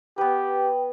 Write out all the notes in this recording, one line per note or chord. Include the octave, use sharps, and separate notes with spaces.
B3 G4 B4 G5